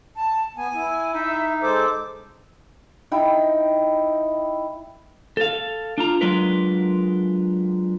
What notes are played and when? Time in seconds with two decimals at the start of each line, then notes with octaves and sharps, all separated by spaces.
0.16 A5
0.57 B3 G#5
0.74 E4
1.14 D#4 E5
1.62 G#3 A4 C5 D6
3.11 D#4 E4 G5
5.37 A4 F5
5.98 D4 F4 A#5
6.21 F#3 G#3 D4 F4 A#4 B4